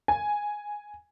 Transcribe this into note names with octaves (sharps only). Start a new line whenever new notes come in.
G#5